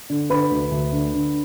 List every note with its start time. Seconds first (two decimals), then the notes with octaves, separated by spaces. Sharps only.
0.10 D3
0.30 D3 B4 B5
0.51 D2
0.71 D2
0.92 D3
1.14 D3